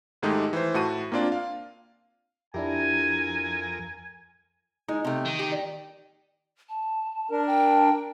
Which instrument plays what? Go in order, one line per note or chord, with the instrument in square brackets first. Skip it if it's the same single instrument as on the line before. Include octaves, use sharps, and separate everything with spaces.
[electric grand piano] G#2 D#3 G#3 A3 D#4 G4
E3 C5
A2 F#4 A5 D#7
A#3 C4 D4 F4 D5
F5
[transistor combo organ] F2 A#4 [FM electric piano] D4 E4 G4 [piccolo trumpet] G#5
[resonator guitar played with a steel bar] G#3 [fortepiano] D#4
[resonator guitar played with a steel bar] C3 A3
[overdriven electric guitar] D#3
[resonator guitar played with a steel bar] G4
[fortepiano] D5
[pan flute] A5
[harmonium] D4 A#4
[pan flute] G5